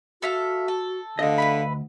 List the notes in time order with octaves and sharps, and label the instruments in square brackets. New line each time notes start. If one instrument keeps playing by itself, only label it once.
[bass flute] F#4 [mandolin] A4 E5 F5
[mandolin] A4
[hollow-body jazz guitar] D2 D#5 [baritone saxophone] D3 [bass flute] F5
[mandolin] B4 E5 B5